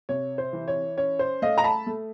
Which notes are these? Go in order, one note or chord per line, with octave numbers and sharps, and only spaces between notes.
C3 C#5
C5
E3
C#5
C#4 C#5
C5
A3 D#5 F5
A#5
A5 B5
A3